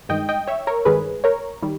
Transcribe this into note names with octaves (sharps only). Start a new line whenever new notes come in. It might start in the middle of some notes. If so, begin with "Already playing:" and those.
G2 D#3 G#3 D#5 G5
D#5 G5
C#5 E5
A#4 C#5
G2 D#3 G#3 G#4 B4
A#4 C#5
D#3 G3